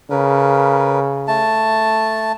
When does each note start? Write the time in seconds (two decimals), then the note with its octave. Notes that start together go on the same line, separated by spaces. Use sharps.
0.10 C#3 A#4 B4
1.27 A3 A5